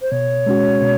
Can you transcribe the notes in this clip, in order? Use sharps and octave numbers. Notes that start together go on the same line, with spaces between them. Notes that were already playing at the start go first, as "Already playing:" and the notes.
C5
B2 C#5
G#3 C#4 F#4
B2